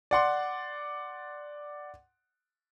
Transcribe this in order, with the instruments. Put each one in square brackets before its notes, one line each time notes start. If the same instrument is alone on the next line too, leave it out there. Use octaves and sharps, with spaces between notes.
[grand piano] D5 F#5 C6